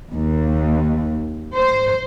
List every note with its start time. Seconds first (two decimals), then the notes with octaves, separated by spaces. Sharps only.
0.12 D#2
1.56 C5